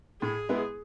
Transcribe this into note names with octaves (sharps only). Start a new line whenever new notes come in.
A2 G#4
G#3 B3 E4 B4